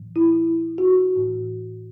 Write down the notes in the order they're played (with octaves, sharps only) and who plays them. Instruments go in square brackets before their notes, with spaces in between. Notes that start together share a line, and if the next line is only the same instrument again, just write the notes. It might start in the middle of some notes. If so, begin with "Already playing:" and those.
Already playing: [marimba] A2 E3
E4
F#4
A2 E3